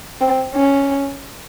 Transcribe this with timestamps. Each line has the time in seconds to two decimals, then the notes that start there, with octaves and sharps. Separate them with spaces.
0.21 C4
0.55 C#4